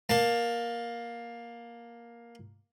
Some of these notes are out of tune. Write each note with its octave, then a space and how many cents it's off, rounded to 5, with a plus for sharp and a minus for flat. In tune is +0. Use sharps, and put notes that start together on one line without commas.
A#3 +10 A5 +15